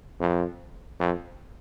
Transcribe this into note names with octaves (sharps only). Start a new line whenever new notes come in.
F2
F2